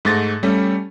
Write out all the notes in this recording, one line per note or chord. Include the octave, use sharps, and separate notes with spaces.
G#2 A3 A6 A#6
G3 A3 C#4